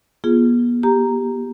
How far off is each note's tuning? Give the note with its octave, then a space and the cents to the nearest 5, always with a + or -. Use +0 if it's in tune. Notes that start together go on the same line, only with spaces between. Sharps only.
B3 -40 F4 -15 G#4 +0
A#3 +0 G4 +0 A#5 -5